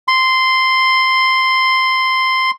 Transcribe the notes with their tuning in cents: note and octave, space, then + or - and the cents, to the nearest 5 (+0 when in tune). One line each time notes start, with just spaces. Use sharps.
C6 -5